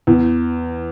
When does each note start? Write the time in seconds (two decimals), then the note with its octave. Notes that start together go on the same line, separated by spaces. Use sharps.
0.07 E2